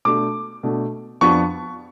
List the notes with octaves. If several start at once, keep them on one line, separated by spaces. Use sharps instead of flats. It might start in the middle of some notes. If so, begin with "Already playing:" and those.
B2 A3 D4 D6
B2 A3 D4
F2 F3 B3 D4 C#6